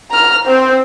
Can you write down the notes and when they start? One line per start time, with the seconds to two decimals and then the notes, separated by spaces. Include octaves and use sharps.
0.11 A#5 F6
0.46 C4 C5